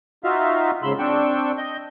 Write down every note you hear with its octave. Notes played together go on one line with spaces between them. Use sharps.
D#4 F4 F#4 E5 F5
G#2 C#3 B5 C6 E6
C4 D4 G5 C#6 E6
D#5 G6